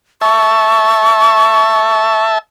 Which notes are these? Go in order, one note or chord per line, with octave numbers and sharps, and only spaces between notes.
E5 A5 C#6